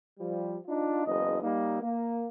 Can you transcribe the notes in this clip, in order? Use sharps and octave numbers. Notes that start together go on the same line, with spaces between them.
F3 G3
D4 D#4 F4
F#1 E2 D#5
G3 A#3 D#4
A#3